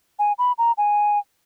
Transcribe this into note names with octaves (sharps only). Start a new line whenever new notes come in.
G#5
B5
A#5
G#5